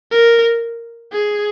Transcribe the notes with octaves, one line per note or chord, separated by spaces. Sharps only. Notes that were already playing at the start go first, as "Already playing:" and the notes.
A#4
G#4